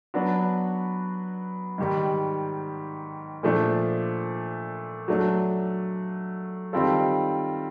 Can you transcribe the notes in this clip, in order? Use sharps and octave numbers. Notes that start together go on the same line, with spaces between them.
F#3 B3 D4 F#4
G#2 D#3 G3
A#2 F3 A3 D4
F#3 A3 D4
D#3 G3 C4 F4 A4